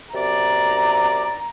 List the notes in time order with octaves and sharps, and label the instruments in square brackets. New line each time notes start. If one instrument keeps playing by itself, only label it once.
[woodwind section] F#2 C3 D5 [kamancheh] A#5